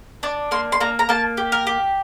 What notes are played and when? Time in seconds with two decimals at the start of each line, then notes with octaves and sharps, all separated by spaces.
0.23 D4 D5
0.51 A#3 C6
0.72 C6
0.80 A#3 A#5
0.99 A#5
1.09 A#3 A5
1.37 G4
1.52 A#4
1.67 G4